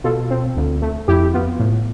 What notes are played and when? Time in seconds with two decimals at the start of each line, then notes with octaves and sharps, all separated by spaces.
0.04 B2 F4 A4
0.30 C4
0.56 D2
0.82 A3
1.08 F2 E4 G4
1.34 B3 F4
1.60 A2